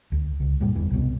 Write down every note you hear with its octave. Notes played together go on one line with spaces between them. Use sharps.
D2
C#2
G2 A#2 G3
G1 E2 E3
C2 B2